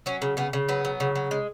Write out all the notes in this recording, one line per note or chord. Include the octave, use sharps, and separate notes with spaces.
F#3 C#4
C#3
C#3 B3
C#3
F#3 B3
F#3
C#3
F#3
G#3